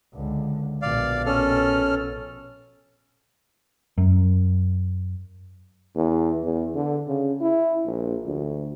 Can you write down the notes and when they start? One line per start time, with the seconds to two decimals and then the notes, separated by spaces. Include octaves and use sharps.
0.14 C#2 D3
0.82 A#1 B2 D5 F5
1.26 C#4 A4 F6
3.98 F#2
5.96 E2
6.43 E2
6.75 D3
7.08 C#3
7.41 E4
7.85 A#1
8.26 D2